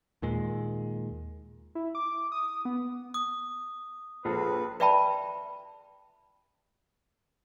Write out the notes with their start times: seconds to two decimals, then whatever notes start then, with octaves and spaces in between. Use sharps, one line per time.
0.22 D#2 A#2 G#3
1.75 E4
1.95 D6
2.32 D#6
2.65 B3
3.14 D#6
4.25 A#1 F4 G#4 A4 B4
4.80 B4 D5 E5 G5 A5 B5